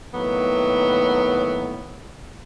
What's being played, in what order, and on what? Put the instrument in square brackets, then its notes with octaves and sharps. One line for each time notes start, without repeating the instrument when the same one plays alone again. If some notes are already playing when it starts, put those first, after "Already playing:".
[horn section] A2 D#3 F#3 A#3 B3